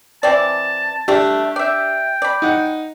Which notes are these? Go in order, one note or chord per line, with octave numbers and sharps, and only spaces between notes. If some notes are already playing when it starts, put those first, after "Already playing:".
E3 C4 D5 A5
G3 A3 D4 G4
D5 E5 G5
D5 B5
D#4 F#5